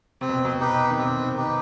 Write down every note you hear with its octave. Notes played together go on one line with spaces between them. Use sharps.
C3 C4
B2
B2
D#4 G4 B4
D#3
C3 C4
D#3
D#4 G4 B4